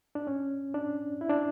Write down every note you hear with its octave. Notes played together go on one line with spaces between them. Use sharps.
D4
C#4
D4
E4
D4